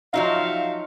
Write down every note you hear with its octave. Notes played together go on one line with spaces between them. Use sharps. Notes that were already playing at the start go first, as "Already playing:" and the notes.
F3 F#3 D#4 F#4 E5 F5